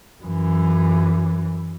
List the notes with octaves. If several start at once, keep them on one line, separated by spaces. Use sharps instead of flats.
F#2 E3